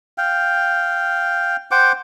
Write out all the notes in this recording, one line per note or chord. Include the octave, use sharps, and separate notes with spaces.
F5 G5
C5 F#5 G5 D6